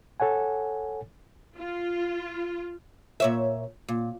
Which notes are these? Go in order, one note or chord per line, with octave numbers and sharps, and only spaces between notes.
A4 C#5 F#5 G#5
F4
A#2 C#5 E5
A#2